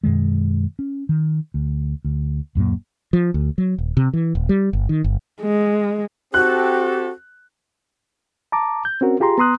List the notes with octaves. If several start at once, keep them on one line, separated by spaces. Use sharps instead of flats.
F#2 B2 D#3 G#3
C#4
D#3
D2
D2
D1 F#2 A#2 A#3
F3
D2
F#3
D#1
C3
E3
D#1
G3
G1
D#3
G1
G#3
C4 F#4 G4 A4 F#6
A5 A#5 D6
G6
C4 C#4 F#4 A#4
F4 G4 G#4 A#5 C6
B3 A#5 C6 D#6 F#6